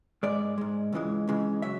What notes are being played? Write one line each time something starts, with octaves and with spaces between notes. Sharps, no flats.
G#2 G#3 D5
G#2 G#3
C#2 C#3 E3 G#3
C#2 C#3 E3 G#3
C#3 F#3 E5